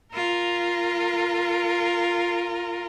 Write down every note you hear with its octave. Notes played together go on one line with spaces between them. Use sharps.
F4 A#4